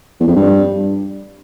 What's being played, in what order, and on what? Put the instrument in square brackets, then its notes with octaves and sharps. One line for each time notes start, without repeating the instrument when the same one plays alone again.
[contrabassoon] E2
F2
G2